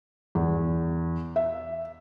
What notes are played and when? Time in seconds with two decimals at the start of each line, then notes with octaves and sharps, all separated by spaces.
0.35 E2
1.36 E5